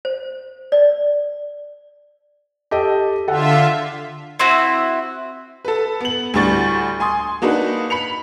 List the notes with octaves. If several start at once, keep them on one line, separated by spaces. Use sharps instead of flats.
C5
D5
G4 A4 D#5
D3 F4 A4 E5 F#5
C4 E4 F#4
A4 B4
B3 F#7
D2 A2 G3 D4 C#6 A6
G#5 C6 D#6
A#3 D4 D#4 F#4 B4
B5 C#7 F7